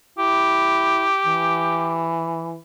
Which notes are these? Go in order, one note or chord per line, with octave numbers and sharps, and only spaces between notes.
E4 G4
E3